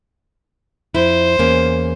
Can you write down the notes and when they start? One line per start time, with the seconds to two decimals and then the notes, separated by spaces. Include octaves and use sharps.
0.95 F2 E4 C5
1.39 E2 A#3 C#4